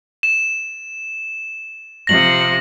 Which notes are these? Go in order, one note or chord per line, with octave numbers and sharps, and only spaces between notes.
E7
C3 F3 A#6 F#7